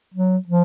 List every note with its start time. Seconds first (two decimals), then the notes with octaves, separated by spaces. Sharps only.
0.15 F#3
0.48 F3